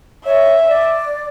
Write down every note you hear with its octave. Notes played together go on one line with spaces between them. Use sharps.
C#5 E5
D5